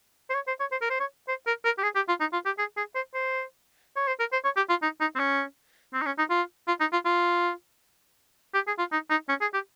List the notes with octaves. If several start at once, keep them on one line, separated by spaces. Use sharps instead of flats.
C5
C#5
C5
C#5
C5
A#4
C5
C#5
C5
A#4
A#4
G4
G#4
G4
F4
D#4
F4
G4
G#4
G#4
C5
C5
C#5
C5
A#4
C5
C#5
G4
F4
D#4
D#4
C4
C#4
C4
D#4
C#4
D#4
F4
F4
D#4
F4
F4
G4
G#4
F4
D#4
D#4
C#4
G#4
G4